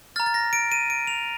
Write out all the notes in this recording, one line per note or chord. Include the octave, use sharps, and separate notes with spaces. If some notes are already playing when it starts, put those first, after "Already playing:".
A#5 F6 A6
A6
A#6
D7
D#7
D7
F7